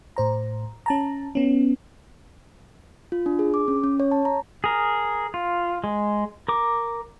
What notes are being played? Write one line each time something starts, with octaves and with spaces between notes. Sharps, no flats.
A2 C5 A#5
C#4 A5 A#5
B3 C#4
F4
D4
G#4
D6
C#4
C#4
C#5
A5
A#5
G#4 A#4
F4
G#3
A#4 D6